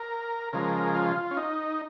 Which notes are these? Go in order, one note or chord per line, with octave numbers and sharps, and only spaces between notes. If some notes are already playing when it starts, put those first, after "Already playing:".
Already playing: A#4
C#3 F3 G#3 A#4
F4
C#4
D#4